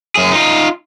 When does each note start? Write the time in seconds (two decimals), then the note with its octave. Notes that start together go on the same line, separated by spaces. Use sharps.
0.15 F#2 G#4
0.32 D#4 F4